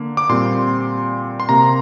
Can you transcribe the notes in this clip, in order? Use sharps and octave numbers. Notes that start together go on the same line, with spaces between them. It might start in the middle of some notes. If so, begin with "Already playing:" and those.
Already playing: D3 A#3
D6
A#2 G3 C4 C6
C6
C3 A#3 A#5